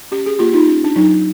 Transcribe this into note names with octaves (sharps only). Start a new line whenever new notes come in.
C#4 G4
G#4
A#3 F4 G4
D#4 F4
C#4
D4
F#3 D#4